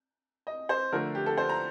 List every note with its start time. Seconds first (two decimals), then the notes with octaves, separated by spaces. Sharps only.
0.47 D#5
0.69 C5
0.92 D3 F3 A3 A#4
1.15 G4
1.26 A4
1.37 C5
1.49 A#5